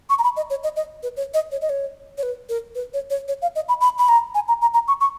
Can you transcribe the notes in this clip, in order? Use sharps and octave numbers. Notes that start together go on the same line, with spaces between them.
C#6
A#5
B5
D#5
C#5
D#5
D#5
B4
C#5
D#5
C#5
D#5
C#5
C#5
B4
A#4
B4
C#5
C#5
C#5
F5
D#5
B5
B5
B5
A#5
G#5
A#5
A#5
A#5
C#6
C#6